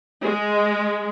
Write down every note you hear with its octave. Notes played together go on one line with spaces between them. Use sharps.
G#3